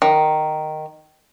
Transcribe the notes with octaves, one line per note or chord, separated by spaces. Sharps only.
D#3